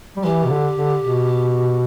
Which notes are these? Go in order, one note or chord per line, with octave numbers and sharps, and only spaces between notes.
G3
E3 G4
B2
D3
D3
B2